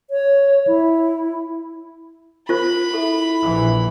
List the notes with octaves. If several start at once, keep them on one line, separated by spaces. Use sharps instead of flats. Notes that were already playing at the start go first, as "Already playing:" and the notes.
C#5
E4
F4 A#4 C5 B5
E4 A4
A#1 E3